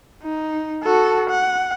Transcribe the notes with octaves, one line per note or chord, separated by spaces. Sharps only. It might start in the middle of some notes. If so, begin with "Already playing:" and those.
D#4
F#4 A4
F#5